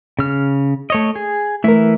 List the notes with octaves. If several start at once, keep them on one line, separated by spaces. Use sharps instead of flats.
C#3 F6
A3 C#5 D#5
G#4
E3 A3 A#4 E5